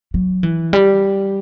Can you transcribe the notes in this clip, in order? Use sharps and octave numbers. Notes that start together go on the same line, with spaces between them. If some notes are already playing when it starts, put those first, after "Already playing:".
F#3
E3
G3